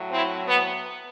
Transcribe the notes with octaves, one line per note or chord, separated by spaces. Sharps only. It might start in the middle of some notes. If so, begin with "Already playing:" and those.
Already playing: A2 F#3
C4 E4
B3